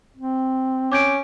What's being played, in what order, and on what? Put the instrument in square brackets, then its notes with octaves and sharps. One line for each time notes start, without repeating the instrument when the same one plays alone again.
[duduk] C4
[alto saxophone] C#4 [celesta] D6 G6 D7